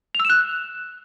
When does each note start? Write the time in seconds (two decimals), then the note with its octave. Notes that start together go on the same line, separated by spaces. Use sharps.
0.15 F7
0.20 E6
0.25 E7
0.30 F#6